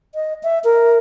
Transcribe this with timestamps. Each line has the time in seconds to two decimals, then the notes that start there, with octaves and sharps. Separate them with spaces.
0.15 D#5
0.43 E5
0.64 A#4